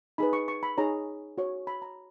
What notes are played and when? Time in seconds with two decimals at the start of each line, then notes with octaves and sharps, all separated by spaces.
0.18 D#4 G#4 B4 B5
0.33 C#6
0.48 C#6
0.63 B5
0.77 D#4 G#4 C#5 A#5
1.38 F#4 C#5
1.67 B5
1.82 A#5